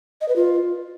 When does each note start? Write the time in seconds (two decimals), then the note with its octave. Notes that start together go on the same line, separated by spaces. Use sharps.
0.21 D#5
0.28 B4
0.36 F4